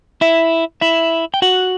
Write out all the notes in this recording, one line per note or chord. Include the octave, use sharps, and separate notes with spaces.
E4 E5
E4 E5
G5
F#4 F#5